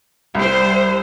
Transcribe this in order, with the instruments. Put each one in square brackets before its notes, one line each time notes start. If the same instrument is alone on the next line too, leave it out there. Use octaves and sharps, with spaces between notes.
[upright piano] C2 [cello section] G3 C5